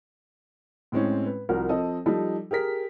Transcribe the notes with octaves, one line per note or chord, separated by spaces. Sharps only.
A2 G#3 C4 C#4
B4
C2 F3 F#4 A#4
F3 C4 A4 D#5
F3 G3 D#4 A4
G4 G#4 A#4 B6